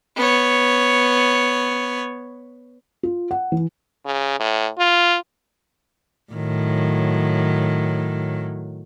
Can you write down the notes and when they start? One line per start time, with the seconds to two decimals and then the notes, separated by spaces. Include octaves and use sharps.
0.17 B3 C#5
3.03 F4
3.31 F#5
3.52 E3
4.05 C#3
4.39 A2
4.78 F4
6.33 A2 D#3 F#3